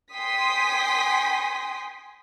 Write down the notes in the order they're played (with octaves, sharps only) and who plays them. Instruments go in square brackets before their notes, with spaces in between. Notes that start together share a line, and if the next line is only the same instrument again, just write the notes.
[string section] G5 G#5 C6 D#6 B6